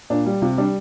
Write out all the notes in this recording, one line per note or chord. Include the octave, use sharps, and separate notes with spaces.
A#2 D4
G3
C3 F4
G3 D4